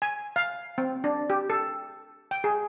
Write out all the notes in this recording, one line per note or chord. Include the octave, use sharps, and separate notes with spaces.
G#5
F5
C4
D4
G4
A4
G5
G#4